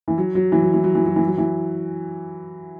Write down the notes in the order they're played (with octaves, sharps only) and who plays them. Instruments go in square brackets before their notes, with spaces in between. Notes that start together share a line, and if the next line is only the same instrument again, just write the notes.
[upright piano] E3
F#3
F#3
E3
F#3
E3
F#3
E3
F#3
E3
F#3
E3